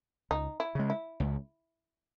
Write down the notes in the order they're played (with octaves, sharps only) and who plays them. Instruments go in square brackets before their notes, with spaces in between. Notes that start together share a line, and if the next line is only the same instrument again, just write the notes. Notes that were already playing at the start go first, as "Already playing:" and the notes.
[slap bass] C#2 [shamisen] D#4
[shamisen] E4
[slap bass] C#3 G#3
[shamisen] E4
[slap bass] C#2